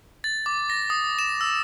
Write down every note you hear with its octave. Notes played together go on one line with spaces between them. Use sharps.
A6
D6
A#6
D#6
E7
E6